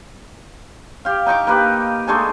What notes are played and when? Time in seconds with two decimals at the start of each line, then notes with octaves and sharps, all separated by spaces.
1.05 G4 F5
1.26 D#4 G5 C#6 D6
1.47 A#3 D#4 G4 B4
2.07 G#3 A3 D4 G#4